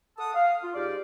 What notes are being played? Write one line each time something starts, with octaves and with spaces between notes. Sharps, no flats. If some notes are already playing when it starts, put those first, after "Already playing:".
A4 F#5 A5 D#6
F5
F4
G#2 G4 D5